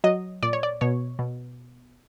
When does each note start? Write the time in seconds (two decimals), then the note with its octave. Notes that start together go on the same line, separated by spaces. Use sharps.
0.04 F#3 D#5
0.43 A#2 D5
0.53 C#5
0.63 D5
0.81 B2 C#5
1.19 B2